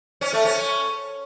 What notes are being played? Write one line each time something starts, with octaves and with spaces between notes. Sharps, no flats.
C#4
A3
C#4